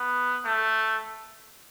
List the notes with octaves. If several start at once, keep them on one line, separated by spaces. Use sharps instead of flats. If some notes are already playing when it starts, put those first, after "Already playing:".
Already playing: B3
A3